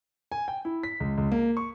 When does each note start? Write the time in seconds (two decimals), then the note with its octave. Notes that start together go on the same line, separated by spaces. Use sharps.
0.32 G#5
0.48 G5
0.65 E4
0.84 B6
1.00 C#2
1.18 C#2
1.32 A#3
1.57 C#6